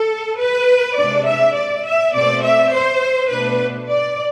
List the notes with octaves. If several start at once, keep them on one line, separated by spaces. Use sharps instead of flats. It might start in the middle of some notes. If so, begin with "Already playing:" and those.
Already playing: A4
B4
C3 G#3 D4 D5
E5
D5
E5
B2 A3 C4 D5
E5
C5
B2 A3 D4 B4
D5